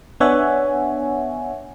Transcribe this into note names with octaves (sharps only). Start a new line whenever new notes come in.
B3 D4 C#5 E5 F#5 G#5